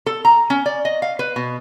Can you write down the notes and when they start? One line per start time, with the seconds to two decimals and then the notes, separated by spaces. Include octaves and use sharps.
0.06 A4
0.25 A#5
0.50 C#4
0.66 D5
0.85 D#5
1.02 F5
1.19 B4
1.36 B2